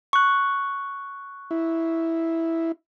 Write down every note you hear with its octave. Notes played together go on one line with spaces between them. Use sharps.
C#6 F#6
E4